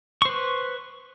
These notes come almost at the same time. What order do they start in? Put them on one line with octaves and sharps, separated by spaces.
C#6 C5 B4